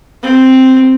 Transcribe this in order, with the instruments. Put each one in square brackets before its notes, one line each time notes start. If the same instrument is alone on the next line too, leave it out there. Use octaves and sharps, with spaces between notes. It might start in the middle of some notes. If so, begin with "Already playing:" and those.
[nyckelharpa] C4